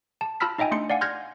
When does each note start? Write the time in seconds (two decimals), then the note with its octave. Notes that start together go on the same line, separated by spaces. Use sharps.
0.21 A5
0.40 F4 A5 B5 E6 F6 B6
0.58 D#4 D#5 E5 G5 G#5
0.71 A3 D4 C6 C#7
0.90 D5 F5 F#5 G#5
1.01 C6 F6 G6 G#6 A#6